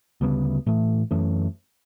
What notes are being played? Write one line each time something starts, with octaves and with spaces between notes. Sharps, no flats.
D2 C#3 G3 B3
A2 E3 A3
F#2 E3 A3 C#4